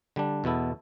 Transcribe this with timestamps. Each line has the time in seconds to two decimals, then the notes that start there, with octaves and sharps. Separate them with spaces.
0.16 D3 G3 D4
0.44 E2 B2 B3 E4 A4